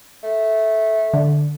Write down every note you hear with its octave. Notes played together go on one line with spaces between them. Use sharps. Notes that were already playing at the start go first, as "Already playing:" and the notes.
A3
D3